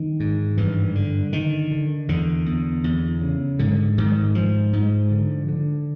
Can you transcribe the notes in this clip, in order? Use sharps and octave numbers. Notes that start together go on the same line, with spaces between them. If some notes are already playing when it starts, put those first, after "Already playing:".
Already playing: D#3
G#2
G2 E3
D3
D3 D#3
D3
E2 D3
E2
E2
C#3
G#2 D3
G#2 D#3
G#2 F3
G#2
D3
D3